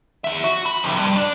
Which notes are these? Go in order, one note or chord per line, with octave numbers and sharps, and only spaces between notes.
E2 E5
F#4
E2 B5
F2 C3
G2
D4